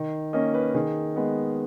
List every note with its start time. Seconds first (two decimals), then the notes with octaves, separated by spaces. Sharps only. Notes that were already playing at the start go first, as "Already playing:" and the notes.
Already playing: D#3
0.33 A#3 C#4 D#5
0.54 B4
0.74 D#3 G#4
1.16 G#3 B3